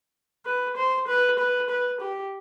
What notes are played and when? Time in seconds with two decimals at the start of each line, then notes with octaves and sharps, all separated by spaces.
0.46 B4
0.77 C5
1.08 B4
1.39 B4
1.70 B4
2.01 G4